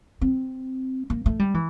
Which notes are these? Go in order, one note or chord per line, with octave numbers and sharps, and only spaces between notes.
C4
A#3
A3
G3
E3